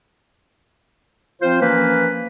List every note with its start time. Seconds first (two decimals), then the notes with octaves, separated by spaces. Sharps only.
1.42 F3 C4 F4 C5
1.62 E3 F3 A#3 C#4 B4